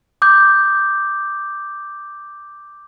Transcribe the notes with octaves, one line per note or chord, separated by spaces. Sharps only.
D6 D#6 G6